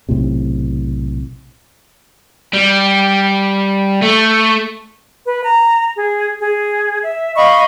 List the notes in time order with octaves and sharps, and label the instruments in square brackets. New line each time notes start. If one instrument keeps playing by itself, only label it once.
[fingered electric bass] B1 A2 C3
[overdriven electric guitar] G3
A3
[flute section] B4
A#5
G#4
G#4
E5
D#5 F5 B5 C#6